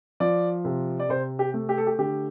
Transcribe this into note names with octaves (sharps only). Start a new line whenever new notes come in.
F3 D5
C3
D5
C3 C5
G4
A3
G4
A4
G4
D3 G4